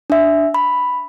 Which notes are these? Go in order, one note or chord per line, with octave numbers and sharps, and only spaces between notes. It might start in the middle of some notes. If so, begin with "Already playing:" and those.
D4 E5
B5